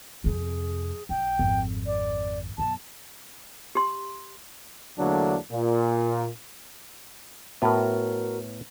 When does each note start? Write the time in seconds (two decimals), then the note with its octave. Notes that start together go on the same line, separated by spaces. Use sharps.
0.24 F2 C3 G#4
1.09 B1 C#4 G5
1.39 G#1 F2
1.86 D5
2.58 F#2 B2 A5
3.75 G4 C6
4.98 E2 D3 F#3 A3 A#3 D4
5.51 A#2
7.62 A2 B3 F#4 A#4